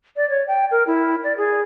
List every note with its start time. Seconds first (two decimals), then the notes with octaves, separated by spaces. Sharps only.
0.16 D5
0.30 C#5
0.48 G5
0.71 A#4
0.87 E4
1.24 D5
1.37 G#4